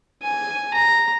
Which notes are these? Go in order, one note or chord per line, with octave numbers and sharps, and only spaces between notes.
G#5
A#5